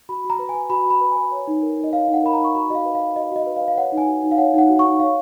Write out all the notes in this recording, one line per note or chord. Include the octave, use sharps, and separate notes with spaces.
F#4 B5
F#4
A#5
B4
G#5
B4
F#4 B5
F#4 B5
B4
B4 G#5
C#5
D#4
A#4
D#4
D#5
C#5 F5
D#4
F#5
A#4 B5
D#4 A#5
C#6
F#4 B5
F#4 D#5 F5
B4
F5
B4
F#4 D#5
F#4 D#5
B4
F5
B4
F5
C#5 F#5
D#4
G#5
F#4
D#4
F5
C#5 F#5
D#4 F#5
F#4
C#6
D#4
C#5 F5